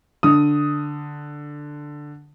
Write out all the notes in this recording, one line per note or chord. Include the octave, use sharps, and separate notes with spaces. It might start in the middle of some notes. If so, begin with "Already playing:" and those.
D3 D#6